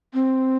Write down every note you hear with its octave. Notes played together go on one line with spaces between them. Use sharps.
C4